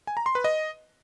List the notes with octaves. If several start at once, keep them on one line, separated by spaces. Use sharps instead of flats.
G#5
A#5
C6
B4
D#5